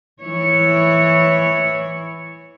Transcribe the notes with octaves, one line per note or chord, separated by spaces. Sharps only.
E3 E4 C#5